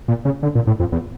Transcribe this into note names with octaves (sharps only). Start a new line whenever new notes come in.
A#2
C#3
D3
A#2
A2
F2
E2